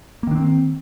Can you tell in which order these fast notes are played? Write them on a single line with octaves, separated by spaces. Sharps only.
A#3 D#3 D4 C4